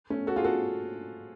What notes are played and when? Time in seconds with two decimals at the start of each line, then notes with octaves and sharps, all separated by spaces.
0.10 A3 C#4
0.27 F#4 A4
0.36 F4 G#4
0.44 F#4 A4